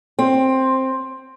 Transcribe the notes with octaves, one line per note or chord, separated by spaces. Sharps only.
C4